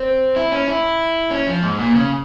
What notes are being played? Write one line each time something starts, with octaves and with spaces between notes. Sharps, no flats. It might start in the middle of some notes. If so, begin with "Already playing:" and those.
Already playing: C4
E4
C#4
E4
C#4
F3
G#2
A#2
C#3